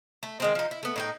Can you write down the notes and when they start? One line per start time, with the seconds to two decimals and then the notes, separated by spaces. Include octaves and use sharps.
0.23 A3
0.40 D#3 G#3 C4
0.55 F3 D#4
0.71 E4
0.83 A3 B3
0.96 A2 D#4 G5